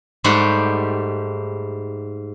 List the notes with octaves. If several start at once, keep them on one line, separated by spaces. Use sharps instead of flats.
G#2 G3 A3 G4 F#5